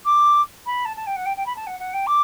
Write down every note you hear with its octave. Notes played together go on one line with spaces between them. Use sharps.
D6
B5
A5
A5
G5
F#5
G5
G5
B5
A5
F#5
F#5
G5
D6